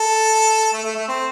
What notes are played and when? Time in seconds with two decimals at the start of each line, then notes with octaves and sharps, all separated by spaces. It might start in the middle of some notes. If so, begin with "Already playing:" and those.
Already playing: A4
0.73 A3
0.85 A3
0.96 A3
1.08 C4